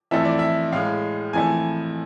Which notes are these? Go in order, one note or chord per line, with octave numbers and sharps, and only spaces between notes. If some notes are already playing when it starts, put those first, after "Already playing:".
F2 E3 A3 E5
D5
E5
A2 G#3 F5
F2 E3 A3 G#5